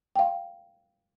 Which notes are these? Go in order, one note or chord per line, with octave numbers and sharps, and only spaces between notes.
F5 G5